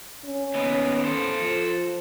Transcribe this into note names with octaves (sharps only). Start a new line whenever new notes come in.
C#4
D#2 B3
A4 C5
F3